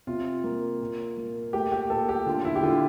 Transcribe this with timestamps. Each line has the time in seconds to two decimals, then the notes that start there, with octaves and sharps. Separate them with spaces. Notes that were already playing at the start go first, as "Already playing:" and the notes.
0.07 C3 F4
0.44 A#3
0.80 A#2
1.17 A#3
1.53 A3 G4
1.72 G4
1.90 A#2 A4
2.09 G4
2.26 D3 F4
2.45 E4
2.55 G4
2.63 D3 F4